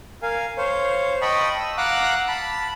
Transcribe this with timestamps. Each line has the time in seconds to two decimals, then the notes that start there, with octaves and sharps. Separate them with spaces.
0.22 A#4 F5 G#5
0.57 C5 C#5 F5
1.22 D#5 G5 A5 B5 C#6 D#6
1.59 E6
1.78 F5 F#5 A#5 D6 E6 F#6
2.28 A5 B5